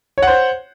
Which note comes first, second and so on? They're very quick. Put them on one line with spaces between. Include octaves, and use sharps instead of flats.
C#5 F#5 C5